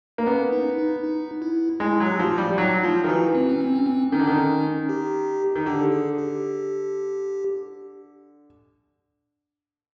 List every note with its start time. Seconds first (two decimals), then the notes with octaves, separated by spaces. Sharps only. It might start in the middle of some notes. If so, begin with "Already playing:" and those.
0.18 A#3
0.26 B3 C#4
0.52 D#4
0.78 D#4
1.04 D#4
1.42 E4
1.80 G#3 E4
2.00 F#3
2.06 G4
2.19 F3 F#4
2.33 G4
2.38 G3
2.58 F#3 D#4
2.83 F3 F4
3.04 D#3
3.09 E3 F#4
3.34 C4
3.49 C#4
3.61 C4
3.75 C#4
3.86 C4
4.12 D#3 C#4
4.19 D3
4.27 D#3
4.89 G4
5.56 D#3
5.66 D3 G4
5.92 G#4
6.18 G4